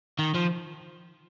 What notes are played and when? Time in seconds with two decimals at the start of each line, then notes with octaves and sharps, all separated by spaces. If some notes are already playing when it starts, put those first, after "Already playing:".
0.19 D#3
0.35 F3